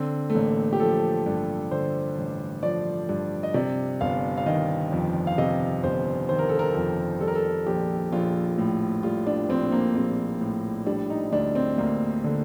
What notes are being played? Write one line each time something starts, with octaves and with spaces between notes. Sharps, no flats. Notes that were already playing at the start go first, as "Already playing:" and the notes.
Already playing: D3 C4
A3
A1 A#3
G4
F3 A4
G2
D3 C5
A1
F3 D5
G2
D#5
C3 D5
G1 F5
F5
D#3 D#5
F2
F5
C3 D#5
G1 C5
D#3 C5
A#4
A4
A#4
F2
G3 A4
A#4
A4
A#1 G4
A#1 F4
A2
G3 F4
D4
A#1 C4
A#3
A#1 C4
A2
G3 D4
D#4
D2 D4
C4
D2 A#3
D3